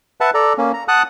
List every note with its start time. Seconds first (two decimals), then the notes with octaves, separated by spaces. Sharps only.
0.21 B4 E5 F#5 A5
0.34 A4 D5 A#5
0.58 A#3 C#4
0.73 A#5
0.88 F#5 A5 D#6 F#6